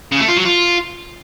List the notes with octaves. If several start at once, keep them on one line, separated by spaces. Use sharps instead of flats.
C#3
A3
F4
F#3
F4